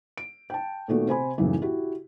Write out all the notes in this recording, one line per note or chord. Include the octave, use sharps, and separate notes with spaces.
D7
G5 A5
A#2 D#3 A3 B3 F#4
C3 C5 G#5 B5
F#1 B1 F#2 A2 C#3 E3
E4 F#4 G4